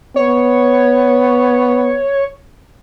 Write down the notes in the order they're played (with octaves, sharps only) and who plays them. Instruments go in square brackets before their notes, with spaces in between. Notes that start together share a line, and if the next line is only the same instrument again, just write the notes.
[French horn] B3 [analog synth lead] C#5